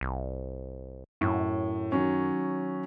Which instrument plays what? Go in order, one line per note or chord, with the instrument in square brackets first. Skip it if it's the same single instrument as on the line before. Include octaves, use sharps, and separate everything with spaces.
[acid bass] C2
[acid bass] F#2 [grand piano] A2
[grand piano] D#3 F#3 C#4